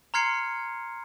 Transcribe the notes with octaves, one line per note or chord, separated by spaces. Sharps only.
A#5 C6 F6 G#6 C7 C#7